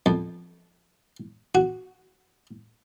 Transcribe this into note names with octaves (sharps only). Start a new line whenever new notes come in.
F2
F#4